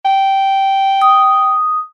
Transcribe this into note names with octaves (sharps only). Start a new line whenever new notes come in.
G5
D#6